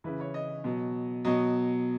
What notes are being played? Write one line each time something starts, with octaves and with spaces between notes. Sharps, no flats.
C#3 E3 B4
C#5
D#5
B2 F#3
B2 F#3 D#5